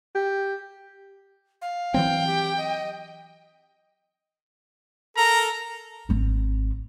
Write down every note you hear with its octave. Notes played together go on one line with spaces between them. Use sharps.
G4
F5
E3 F#3 C4 G5
G4
D#5
A4 A#4 A#5
G#1 C4